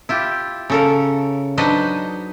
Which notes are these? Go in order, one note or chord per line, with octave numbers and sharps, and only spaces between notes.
E4 F4 G4
C#3 A4 A#4
F#3 D4 D#4 B4 C5 D#5